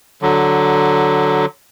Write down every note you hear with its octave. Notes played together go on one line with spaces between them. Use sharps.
D3 F#3